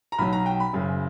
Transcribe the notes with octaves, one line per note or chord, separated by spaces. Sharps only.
A#5
B1 B2 F#3 B5
A#5
G5
B5
F#1 F#2 C#3